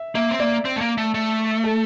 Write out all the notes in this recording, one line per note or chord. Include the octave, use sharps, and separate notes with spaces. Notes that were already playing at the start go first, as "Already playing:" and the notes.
Already playing: E5
A#3 E5
C4
A#3 D5
C4
A3
A#3
A3
A3
A4